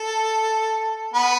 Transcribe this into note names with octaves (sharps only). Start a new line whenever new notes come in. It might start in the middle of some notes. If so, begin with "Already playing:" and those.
Already playing: A4
B3